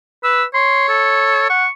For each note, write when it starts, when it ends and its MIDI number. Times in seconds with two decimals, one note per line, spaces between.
0.24 0.45 71
0.24 0.45 88
0.55 1.47 73
0.55 0.87 84
0.89 1.47 69
1.50 1.65 78
1.50 1.70 85